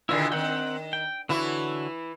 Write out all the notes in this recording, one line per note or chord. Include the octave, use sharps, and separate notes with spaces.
B2 D3 D#3 E4 F4 G#4
D#3 C4 F#5 G5
G5
D3 E3 E4 F#4 C#5